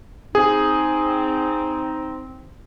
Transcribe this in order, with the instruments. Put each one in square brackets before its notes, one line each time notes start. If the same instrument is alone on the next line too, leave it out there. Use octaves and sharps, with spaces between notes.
[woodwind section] C4 D#4 [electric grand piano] G#4